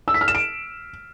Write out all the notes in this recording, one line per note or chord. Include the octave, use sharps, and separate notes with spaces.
E6
B6
F6
E7
D7